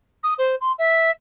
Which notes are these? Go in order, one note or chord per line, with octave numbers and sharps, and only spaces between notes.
D#6
C5
C6
E5